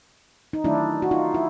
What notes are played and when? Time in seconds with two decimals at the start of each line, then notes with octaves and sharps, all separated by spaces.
0.53 D#4
0.64 D#3 F#3 A3 D4 E4
1.02 F#4
1.11 D#4 F4
1.34 E4